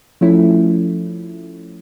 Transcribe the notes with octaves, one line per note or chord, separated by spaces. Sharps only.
F3 A3 C#4 E4